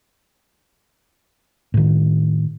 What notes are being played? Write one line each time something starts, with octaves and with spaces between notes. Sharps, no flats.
A2 D#3